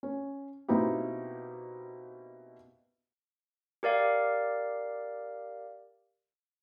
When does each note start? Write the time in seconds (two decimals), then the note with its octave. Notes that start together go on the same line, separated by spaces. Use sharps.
0.03 C#4
0.68 B2 A#3 C4 D#4 E4 G4
3.83 G4 A#4 D5 F5